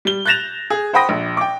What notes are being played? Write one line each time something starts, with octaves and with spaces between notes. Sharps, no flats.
G3 G7
F#6 G6 A6 A#6 E7 F7
G#4
C5 F#5 G5 B5 D#6 A#6
A#1
G5 D6